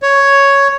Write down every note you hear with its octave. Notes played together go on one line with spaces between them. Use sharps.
C#5